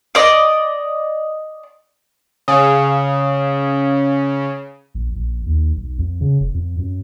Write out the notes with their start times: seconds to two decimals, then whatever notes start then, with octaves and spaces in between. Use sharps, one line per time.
0.15 D5 D#5
2.48 C#3 F5 G#5 D#6
4.95 A#1
5.16 A#1
5.46 D#2
5.76 B1
5.99 F2
6.21 C#3
6.40 F1
6.54 F2
6.79 F#2